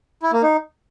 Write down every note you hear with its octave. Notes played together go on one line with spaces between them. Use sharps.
E4
A#3
D#4